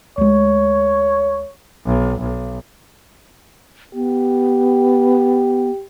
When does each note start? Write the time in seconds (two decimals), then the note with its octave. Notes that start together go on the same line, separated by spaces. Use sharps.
0.18 D2 G#3 C#5
1.86 B1
2.20 B1
3.94 B3 G4